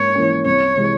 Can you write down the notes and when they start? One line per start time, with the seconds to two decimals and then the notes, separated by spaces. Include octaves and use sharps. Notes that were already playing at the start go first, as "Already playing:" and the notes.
Already playing: G#2 A#3 C#4 C#5
0.15 E3 A#3 C#4
0.46 C2 C#5
0.76 C3 E3 G#3 E4